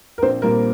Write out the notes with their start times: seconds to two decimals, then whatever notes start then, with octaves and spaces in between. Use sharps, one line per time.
0.18 A#4
0.22 A#1 C4 C5
0.42 A#2 G3 A#3 A#4